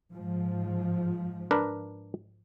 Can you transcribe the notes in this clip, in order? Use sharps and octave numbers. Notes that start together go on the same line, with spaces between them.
G#2 F3
D4 A#4 B4